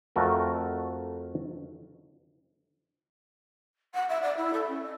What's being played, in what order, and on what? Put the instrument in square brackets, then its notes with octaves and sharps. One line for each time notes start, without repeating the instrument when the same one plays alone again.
[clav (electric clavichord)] F2 A3 F#4 A#4
[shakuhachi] F#5
E5
D5
E4
A4
C#4
D#5